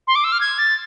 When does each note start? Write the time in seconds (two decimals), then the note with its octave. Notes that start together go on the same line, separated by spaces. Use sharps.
0.07 C6
0.15 D6
0.24 E6
0.32 F6
0.40 G#6
0.58 A6